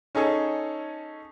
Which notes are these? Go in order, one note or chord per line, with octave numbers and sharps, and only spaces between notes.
C#4 D#4 G#4 A4 C#5